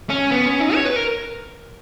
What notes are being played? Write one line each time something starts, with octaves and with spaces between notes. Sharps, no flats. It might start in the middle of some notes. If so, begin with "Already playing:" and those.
C#4
B3
C#4
D#4
C#5
B4
A#4